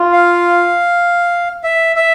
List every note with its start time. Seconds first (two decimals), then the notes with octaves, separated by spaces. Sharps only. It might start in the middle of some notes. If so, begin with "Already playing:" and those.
Already playing: F4
0.12 F5
1.63 E5
1.96 E5